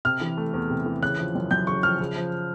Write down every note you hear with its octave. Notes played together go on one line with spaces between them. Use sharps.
C3 F6
E3
A3
E2
C3
E3
C#3 F#6
F3
F#2
F#2 G6
C#3 C#6
F3 F6
C#3
F3